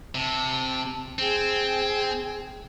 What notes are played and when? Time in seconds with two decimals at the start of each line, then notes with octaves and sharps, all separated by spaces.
0.15 C3 A5
1.19 C4 G#4 G5